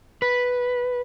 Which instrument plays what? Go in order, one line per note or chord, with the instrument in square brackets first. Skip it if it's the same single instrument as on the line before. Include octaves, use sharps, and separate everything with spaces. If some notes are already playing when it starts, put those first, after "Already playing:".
[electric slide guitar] B4